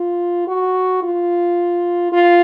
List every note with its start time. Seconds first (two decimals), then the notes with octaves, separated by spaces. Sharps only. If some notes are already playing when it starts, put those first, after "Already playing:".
Already playing: F4
0.47 F#4
1.03 F4
2.12 F4